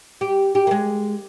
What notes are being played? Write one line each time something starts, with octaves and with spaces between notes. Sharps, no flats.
G4
G4
A#3
G#3